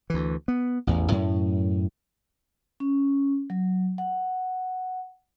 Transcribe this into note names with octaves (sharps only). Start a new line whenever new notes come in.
D2 E3
B3
A1 E2
F#2 A2
C#4
F#3
F#5